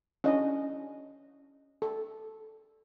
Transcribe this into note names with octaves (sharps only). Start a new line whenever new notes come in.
C#4 D4 E4 D#5
A4